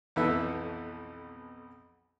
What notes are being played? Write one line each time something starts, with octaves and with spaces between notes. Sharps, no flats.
B1 F2 E3 B3 A4 E5